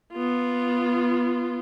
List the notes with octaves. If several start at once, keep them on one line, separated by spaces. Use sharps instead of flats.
B3 F4